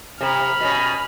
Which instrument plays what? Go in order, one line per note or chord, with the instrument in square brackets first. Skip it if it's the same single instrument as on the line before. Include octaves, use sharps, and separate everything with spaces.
[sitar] C3 [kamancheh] B5 F6
[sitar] B2 C#4